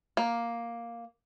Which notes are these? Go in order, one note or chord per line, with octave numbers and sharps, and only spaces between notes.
A#3